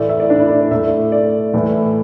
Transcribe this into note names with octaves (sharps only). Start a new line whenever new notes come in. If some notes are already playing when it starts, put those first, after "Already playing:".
Already playing: A2 E3 A3 D5
E5
D5
D4
E4
D5
D5
A2 A3 E5
D5
A2 E3 A3